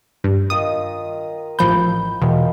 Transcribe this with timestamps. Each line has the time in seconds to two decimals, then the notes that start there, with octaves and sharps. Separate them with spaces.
0.24 G2
0.50 D#3 F4 D#5 D#6
1.59 A1 F3 B5 G6
2.22 E2 B2 D#3 F3